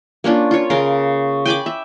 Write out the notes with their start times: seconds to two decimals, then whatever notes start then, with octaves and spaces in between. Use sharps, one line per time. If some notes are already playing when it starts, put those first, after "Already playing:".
0.24 A#3 C#4 D4 F4
0.51 F4 C#5
0.70 C#3 A#4 C6
1.46 G5 G#5 B5 D6
1.66 E5